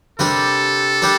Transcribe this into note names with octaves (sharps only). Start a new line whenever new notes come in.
C3 G3 D4 G4 A4 A#4
G3 D4 G4 A#4